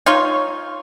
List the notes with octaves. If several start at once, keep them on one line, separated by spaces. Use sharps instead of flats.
D#4 F4 C#5